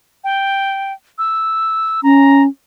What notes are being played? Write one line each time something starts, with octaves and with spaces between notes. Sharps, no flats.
G5
E6
C#4 A#5